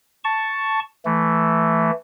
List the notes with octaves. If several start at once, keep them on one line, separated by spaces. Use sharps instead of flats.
A5 C#6
E3 A3